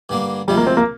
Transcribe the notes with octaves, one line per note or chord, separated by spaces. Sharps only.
G2 D3 G3 A#3
D2 C3 F3 G3 G#3
A#3
C4
A#3